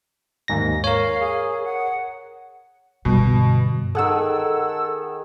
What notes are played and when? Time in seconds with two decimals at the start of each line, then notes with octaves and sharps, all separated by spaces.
0.48 D#2 G#2 A#6
0.84 A#4 C#5 F5
1.20 G#4
1.64 F#5
3.05 G2 B2 D3
3.95 D#3 G#4 A4 F#5 E6